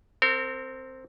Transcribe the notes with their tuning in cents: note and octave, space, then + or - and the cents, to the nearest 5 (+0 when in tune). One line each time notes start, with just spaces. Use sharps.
C4 +0 A#4 -35